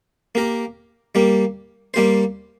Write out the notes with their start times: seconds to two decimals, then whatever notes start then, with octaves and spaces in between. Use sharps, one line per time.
0.35 A#3 G4 A#4
1.15 G3 A#3 G4
1.94 G3 A#3 G4 C5